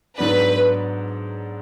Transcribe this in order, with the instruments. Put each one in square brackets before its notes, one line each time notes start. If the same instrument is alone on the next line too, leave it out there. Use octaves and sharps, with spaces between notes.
[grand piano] G#2 F#3 B3 D4 [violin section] B4